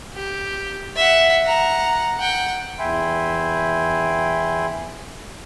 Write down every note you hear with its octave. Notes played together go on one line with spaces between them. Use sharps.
G4
E5 F#5
F#5 A#5
F#5 G5
E2 E5 G5 G#5 B5 C6